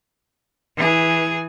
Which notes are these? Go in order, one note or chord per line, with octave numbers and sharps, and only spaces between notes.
E3 G#4